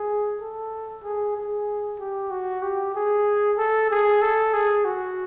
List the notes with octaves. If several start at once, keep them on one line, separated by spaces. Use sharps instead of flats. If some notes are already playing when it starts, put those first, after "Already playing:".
Already playing: G#4
A4
G#4
G#4
G4
F#4
G4
G#4
A4
G#4
A4
G#4
F#4